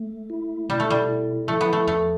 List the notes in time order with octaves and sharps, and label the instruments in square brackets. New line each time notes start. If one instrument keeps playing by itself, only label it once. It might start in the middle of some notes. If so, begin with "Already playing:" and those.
Already playing: [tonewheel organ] A3
E4
[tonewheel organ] B2 [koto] G3
[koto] A3
G3
[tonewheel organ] E4
[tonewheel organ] F3 [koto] A3
[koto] B3
A3
[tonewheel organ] E2 [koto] A3